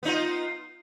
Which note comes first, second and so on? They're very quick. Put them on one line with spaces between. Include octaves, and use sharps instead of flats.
B3 D#4 F4